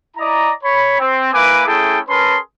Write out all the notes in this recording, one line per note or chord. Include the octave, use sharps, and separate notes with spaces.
E4 D5 D#5 A#5
C#5 B5
C4
A#3 E4 B4 G#5 D6
A3 C#4 E4 G#4 A4 G5
C#4 G#4 A#4 B4 A5 C6